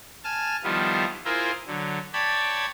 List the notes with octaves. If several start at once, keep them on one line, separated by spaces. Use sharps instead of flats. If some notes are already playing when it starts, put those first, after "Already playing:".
G#5 A5 F6
D#3 F3 G3 B3 E4 F4
E4 F4 G#4 A#4 C5 E5
D3 F#3
C#5 D5 G5 A5 B5 G#6